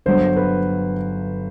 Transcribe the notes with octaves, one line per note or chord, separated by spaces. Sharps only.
G1 G2 F#3 C5
B4